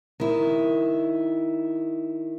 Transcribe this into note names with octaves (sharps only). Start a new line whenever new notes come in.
D#3 E4